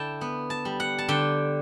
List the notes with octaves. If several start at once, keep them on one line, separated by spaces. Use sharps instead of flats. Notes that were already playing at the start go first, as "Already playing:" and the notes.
Already playing: D3 E4 G5 A5
B3
A5
G3
F#5
A5
D3 G5